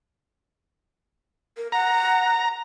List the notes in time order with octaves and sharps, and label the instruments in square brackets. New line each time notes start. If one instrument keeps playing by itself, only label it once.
[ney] A#4
[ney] F#5 [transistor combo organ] A#5